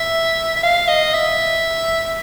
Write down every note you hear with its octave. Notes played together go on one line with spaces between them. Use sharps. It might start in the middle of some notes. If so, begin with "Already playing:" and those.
Already playing: E5
E5
F5
D#5
E5